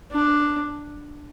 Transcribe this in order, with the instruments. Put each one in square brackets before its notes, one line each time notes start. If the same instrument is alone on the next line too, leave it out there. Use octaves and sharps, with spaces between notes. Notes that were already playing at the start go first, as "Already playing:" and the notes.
[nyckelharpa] D4